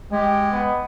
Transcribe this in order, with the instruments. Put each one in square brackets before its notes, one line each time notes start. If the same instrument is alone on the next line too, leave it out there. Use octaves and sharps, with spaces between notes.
[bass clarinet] G#3 [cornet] G4
[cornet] B3